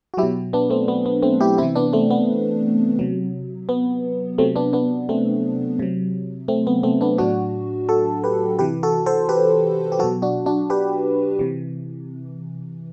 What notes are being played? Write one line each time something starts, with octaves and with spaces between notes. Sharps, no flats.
F#4
F#3 E4 G4
B2
B3 D4
A3 C4
B3
B3
A3 C4
E4 G4
C3 E3 C4 E4
B3 D4
A3 C4
B3
C3 F#3
B3
C3 F#3 A3 C4
B3 D4
B3 D4
A3 C4
C3 F#3
A3 C4
B3
A3 C4
B3 D4
A2 F#3 D4 F#4
F#4 A4
G4 B4
C3 E3 G4 B4
F#4 A4
A4 C5
G4 B4
G4
B2 F#3 F#4 A4
D4 F#4
D4 F#4
G4 B4
C3 E3